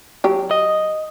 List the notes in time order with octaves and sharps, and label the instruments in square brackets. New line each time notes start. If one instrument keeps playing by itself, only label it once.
[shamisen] F#3 G4
[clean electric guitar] D#5